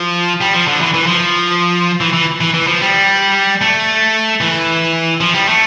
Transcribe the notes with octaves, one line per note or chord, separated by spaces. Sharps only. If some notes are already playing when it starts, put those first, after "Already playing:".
Already playing: F3
G3
F3
D3
E3
E3
F3
E3
E3
E3
E3
F3
G3
A3
E3
F3
G3
A3